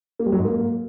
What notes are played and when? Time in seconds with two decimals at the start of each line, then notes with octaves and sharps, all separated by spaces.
0.19 A#3
0.26 G3
0.32 F#3
0.39 G#2
0.45 A#3